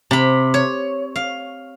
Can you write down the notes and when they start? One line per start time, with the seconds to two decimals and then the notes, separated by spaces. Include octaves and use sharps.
0.11 C3 B5
0.54 C#5
1.16 F5